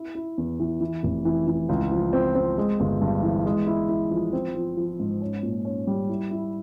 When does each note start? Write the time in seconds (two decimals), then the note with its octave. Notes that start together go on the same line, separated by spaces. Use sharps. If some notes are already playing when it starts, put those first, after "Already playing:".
Already playing: E4
0.15 E4
0.38 E2
0.60 E3
0.81 E3
1.03 F1
1.25 E3
1.47 E3
1.69 C#2
1.92 F3
2.13 C4
2.35 C4
2.58 G#3
2.80 G1
3.02 G2
3.23 E3
3.46 G#3
3.67 E4
3.89 E4
4.11 F3
4.33 C4
4.55 F3
4.77 F3
5.00 G#2
5.21 C#4
5.43 A#2
5.65 C#4
5.87 G3
6.09 E4
6.31 E4